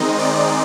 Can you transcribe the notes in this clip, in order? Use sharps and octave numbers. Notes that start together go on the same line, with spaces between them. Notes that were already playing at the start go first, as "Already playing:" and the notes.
Already playing: D#3 G#3 C4 D#4 D#5
D5